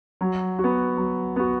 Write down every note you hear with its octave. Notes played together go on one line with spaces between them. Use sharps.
F#3
F#4
B3
F#3
B3 F#4